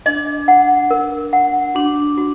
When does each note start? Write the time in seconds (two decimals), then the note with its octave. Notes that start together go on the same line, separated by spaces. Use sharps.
0.06 D4 D#5
0.48 F#5
0.91 A#4
1.33 F#5
1.75 D4 F#4
2.18 F#4